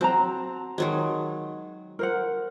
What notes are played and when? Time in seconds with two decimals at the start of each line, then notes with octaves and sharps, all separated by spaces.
0.01 C4 F#4 A5 A#5
0.78 D#3 F#3 G#3
1.99 A#4 C5 F#5